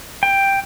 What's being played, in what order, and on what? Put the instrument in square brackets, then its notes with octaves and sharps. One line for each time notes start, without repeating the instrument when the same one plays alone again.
[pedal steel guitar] G5